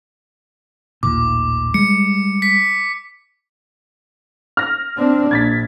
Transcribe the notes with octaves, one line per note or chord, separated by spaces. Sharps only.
A1 D#2 A#2 D6
G3 G#3 C#7
B6
F6 A#6
C4 D4
A#1 G#6 A6 B6